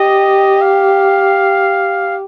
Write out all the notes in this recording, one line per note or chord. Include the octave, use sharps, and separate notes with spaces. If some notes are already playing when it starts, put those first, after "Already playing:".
Already playing: G4 D#5
F5